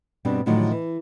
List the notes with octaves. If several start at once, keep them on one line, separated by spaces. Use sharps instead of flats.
G2 B2 G3 C4 D4
A2 D3 D#3 F3 F#3 D#4
E3